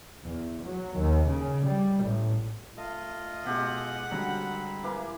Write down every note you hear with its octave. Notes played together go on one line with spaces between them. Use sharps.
E2
F#3
D#2
C#3
G3
A1
A3 F4 D#5
B2 G#3 G4 F#5
D3 F#3 G3 C4 A#5 B5
E3 A#3 F5